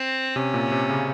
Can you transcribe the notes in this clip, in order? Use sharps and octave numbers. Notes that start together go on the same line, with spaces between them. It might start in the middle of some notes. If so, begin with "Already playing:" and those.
Already playing: C4
C3 C#4
A#2
C3
C#3